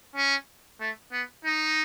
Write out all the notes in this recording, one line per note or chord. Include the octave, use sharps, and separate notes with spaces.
C#4
A3
B3
D#4